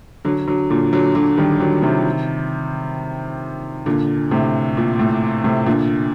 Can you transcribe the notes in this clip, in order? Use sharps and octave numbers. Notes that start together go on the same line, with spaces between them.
D3 F#3
D3 F#3
A#2 D3
D3 F#3
D3 F#3
D#3 G3
D3 F#3
C3 D#3
A#2 D3
A2 C3
A#2
A2
A2 C3
A#2 D3